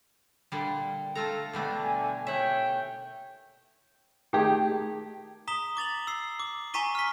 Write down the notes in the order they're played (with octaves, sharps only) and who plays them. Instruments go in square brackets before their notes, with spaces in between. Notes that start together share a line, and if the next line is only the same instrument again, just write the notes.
[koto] A#2 D3 G3
[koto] A3 F4 A#5 [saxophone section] A4
[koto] B2 G3 A3 [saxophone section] D3
[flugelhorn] G#5
[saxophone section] D#2 A2 C#5 [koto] E5 F#5 [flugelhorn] G5
[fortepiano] D#3 G4 [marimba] A3 G#4
[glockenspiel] A#5 D#6 B6 E7 G7
D6 A6 F7 F#7
E6 C7
D6
G#5 A#5 C#6 B6 D#7 G7
F6 B6